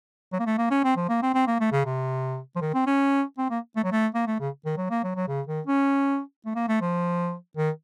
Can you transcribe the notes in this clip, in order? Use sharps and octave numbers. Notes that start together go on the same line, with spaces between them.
F#3
A#3
A3
A#3
C#4
C4
F3
A#3
C4
C4
A#3
A3
C#3
C3
F3
D#3
C4
C#4
C4
A#3
A3
F#3
A3
A#3
A3
C#3
D#3
F#3
A#3
F#3
F#3
C#3
D#3
C#4
A3
A#3
A3
F3
D#3